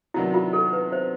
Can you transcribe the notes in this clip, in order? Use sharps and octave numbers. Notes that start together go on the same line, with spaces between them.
C3 D#3 F#3 B3 D4 E4
F4
A4
B4
C5